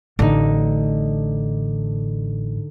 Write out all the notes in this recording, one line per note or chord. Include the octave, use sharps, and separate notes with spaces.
A1 A2 D3 D#4